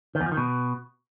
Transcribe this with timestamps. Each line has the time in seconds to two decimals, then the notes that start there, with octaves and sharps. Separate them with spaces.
0.15 D#3
0.21 E2
0.26 F3
0.32 D#3
0.37 B2